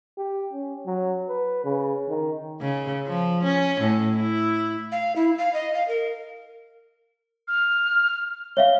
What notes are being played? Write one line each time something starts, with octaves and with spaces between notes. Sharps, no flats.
G4
C#4
F#3
B4
C#3
D#3
C#3
F3
C#4
A2
E4
F5
E4
F5
D#5
F5
A#4
F6
C#5 E5 F5 G7